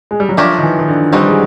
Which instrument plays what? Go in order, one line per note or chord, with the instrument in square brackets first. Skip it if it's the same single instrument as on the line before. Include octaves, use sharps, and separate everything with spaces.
[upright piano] G#3
G3
F#3
[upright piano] F3 [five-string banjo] A3 D4 G4 A#4 C#5
[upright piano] D#3
E3
D#3
D3
[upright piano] G3 [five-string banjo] C4 D#4 F#4
[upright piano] G#3